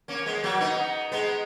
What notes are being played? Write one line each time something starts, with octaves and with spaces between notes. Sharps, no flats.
A#3 C#4
G#3 B3
F#3 A#3
B3 D#4
G#3 B3